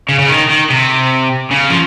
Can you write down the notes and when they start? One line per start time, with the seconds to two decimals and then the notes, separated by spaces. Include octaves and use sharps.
0.09 C#3
0.20 C#3
0.29 D#3
0.49 D#3
0.70 C3
1.51 C#3
1.70 F3